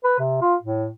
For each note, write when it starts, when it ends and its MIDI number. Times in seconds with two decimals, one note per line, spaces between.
0.04 0.14 71
0.19 0.41 48
0.41 0.54 65
0.62 0.90 45